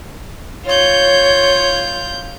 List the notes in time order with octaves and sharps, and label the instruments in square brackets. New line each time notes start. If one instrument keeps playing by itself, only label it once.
[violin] F4 G6 [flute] C#5